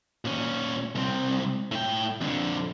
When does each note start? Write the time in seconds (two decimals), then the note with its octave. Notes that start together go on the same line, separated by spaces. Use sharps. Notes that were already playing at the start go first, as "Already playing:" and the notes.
0.25 A#2 C#4
0.95 C2 C4
1.72 A2 G5
2.21 F2 D3